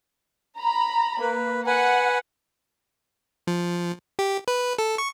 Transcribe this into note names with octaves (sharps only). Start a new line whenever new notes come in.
A#5 B5
A#3 B4
B4 F#5 G#5
F3
G4
B4
A4
C#6